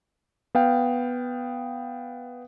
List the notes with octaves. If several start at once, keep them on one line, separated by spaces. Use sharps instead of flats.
B3 F5 G5